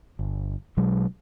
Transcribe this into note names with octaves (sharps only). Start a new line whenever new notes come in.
G1
B1 B2 F#3 G#3